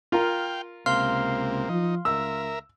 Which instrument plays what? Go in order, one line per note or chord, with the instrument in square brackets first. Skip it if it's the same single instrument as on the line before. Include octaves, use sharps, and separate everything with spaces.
[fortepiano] F4 A#4 [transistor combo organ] F5 G5
[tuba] C#2 [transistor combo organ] C3 A#3 [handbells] F5 C6 F6
[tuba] F3 [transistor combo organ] D#4
[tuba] C#2 [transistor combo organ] A#4 E5 [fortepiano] E6